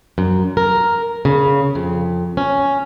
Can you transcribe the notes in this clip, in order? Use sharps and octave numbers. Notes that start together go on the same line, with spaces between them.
F#2
A#4
C#3
F2
C#4